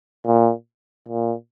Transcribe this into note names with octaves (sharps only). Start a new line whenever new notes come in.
A#2
A#2